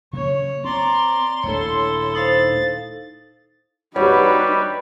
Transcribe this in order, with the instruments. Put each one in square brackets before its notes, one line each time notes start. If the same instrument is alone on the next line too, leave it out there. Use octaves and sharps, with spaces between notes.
[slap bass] C#3 F#3 A#3 [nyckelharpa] C#5
[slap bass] C4 [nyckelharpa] D5 A#5 [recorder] C6
[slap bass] D#1 A3 D4 [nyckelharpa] E4 A4 [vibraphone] C#5
[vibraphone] D#4 C5 F5 [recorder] A6
[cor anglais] G3 [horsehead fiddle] D#4 B4 [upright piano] F#4 G4 [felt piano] C#5